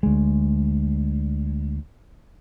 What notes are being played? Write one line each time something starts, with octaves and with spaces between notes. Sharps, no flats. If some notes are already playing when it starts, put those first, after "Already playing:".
D2 G#3